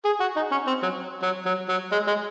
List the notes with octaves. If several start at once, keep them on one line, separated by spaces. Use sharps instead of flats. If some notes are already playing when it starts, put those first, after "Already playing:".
G#4
F#4
D#4
C#4
C4
F#3
F#3
F#3
F#3
G#3
G#3